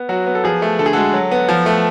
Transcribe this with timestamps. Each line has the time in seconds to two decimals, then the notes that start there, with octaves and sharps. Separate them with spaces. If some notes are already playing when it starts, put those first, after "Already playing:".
Already playing: B3
0.09 F#3 F#4
0.27 B3
0.35 A4
0.44 F3 G#4
0.62 A3
0.79 D3 A4
0.86 G#4
0.93 G#3 F#4 A4
1.14 F#3
1.31 B3
1.49 F3
1.66 A3